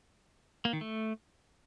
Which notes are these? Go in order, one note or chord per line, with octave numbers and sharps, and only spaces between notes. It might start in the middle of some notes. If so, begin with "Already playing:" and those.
A#3
D#3
A3